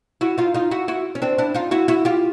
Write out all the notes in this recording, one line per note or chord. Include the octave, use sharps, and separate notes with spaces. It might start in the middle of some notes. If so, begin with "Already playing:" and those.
E4 F#4
D#4 F4
D#4 F4
E4 F#4
E4 F#4
C#4
C4 D4
D4 E4
D#4 F4
E4 F#4
E4 F#4
F4 G4